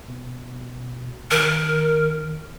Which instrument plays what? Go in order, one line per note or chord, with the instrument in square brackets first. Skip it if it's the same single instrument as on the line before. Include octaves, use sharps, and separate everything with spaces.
[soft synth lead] B2
[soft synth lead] D#3 [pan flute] A#4